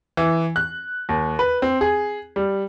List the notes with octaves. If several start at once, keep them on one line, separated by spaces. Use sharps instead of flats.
E3
F#6
D#2
B4
C4
G#4
G3